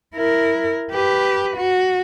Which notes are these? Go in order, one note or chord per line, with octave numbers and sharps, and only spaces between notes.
E4 A#4
G4 B4
F#4